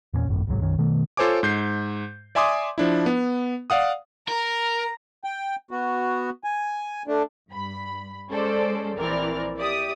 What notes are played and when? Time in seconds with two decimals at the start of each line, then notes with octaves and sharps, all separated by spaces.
0.13 E2 G2 A#2 C#4
0.27 D1 G#1 F#2 A2
0.47 D1 C2 G#2 F#3
0.61 B1 F#2 D#3 C#4
0.79 B2 D#3 A3
1.17 F4 A4 C5 C#5 G#5 D6
1.43 G#2 G6 C7
2.35 D5 E5 G#5 C6 D6 D#6
2.78 F3 D4 E4
3.06 B3
3.70 D5 F5 F#5 D#6
4.28 A#4 A#5
5.24 G5
5.71 B3 F#4
6.44 G#5
7.07 A3 D4
7.51 G2 B5
8.31 G#3 C#4 G#4 A4 C5 D5
8.96 A#1 E3 C4 A#4 D5 F6
9.58 G4 D5 E5 D#6